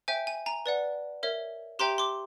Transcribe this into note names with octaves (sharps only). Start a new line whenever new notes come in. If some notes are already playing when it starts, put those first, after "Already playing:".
C5 E5 G5 G#5
G#5
G#5 A#5
B4 D5 F#5
A#4 C#5 E5
G4 C5 E5 G5 A#5 C6
C6 D6